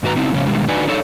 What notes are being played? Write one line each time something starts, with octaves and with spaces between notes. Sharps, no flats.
G#2 D#3 F#4 B4 A#5
C#3 C4 D#4 E4
F2 A2 C#3 C#4
B2 D3 D#3 G3 G#3
D3 D#4 F#4 B4 D5 G#5
D4 D#4 A4 C#5